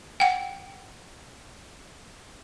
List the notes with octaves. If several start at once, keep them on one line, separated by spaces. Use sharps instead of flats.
F#5 G5